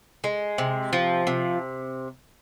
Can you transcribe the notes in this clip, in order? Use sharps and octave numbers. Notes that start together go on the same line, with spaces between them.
G#3
C3
F3
C3